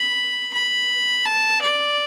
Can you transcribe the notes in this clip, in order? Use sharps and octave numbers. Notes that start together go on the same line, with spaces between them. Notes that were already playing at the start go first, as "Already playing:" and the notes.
Already playing: B5
B5
A5
D5